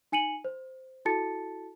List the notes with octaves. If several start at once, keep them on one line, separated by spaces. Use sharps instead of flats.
D#4 G#5 C#7 D#7 F#7
C5
E4 F#4 A4 A5 A6 C#7